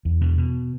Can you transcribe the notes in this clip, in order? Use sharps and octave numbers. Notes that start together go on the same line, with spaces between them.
E2
B2
B2